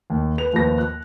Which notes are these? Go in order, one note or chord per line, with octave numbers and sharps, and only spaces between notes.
D#2
B4 F7
D#2 F3 B4 A#6
F#6